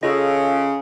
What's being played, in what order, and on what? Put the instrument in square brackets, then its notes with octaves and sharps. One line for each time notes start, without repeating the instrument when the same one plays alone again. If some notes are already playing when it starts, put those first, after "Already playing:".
[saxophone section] C#3 [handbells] F4 A4 D#5